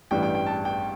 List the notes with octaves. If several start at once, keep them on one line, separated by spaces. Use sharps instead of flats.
A1 G2 E3 G3 D4 G5
G5
G5
A5
G5